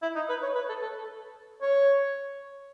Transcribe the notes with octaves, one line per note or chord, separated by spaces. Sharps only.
E4
D#4
B4
C#5
B4
A4
A4
C#5